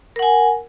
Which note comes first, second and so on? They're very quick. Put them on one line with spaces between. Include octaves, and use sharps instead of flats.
A#4 F#5 G#5